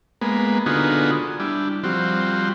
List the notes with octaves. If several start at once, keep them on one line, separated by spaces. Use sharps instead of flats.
G#3 A#3 B3
D3 B3 D#4 F4 F#4 G#4
G3 D4 E4
F3 G3 C4 F#4